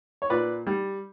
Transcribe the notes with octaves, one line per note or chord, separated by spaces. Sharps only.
C#5
A#2 B4 D5
G3